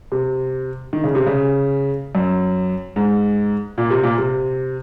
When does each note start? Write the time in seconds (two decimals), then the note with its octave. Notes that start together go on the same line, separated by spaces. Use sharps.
0.12 C3
0.93 D#3
1.04 C#3
1.15 C3
1.26 C#3
2.15 F#2
2.96 G#2
3.78 A#2
3.90 C3
4.03 A#2
4.18 C3